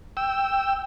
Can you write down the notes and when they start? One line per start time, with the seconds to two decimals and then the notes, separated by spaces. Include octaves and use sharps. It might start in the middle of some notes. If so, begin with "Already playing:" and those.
0.17 G5 E6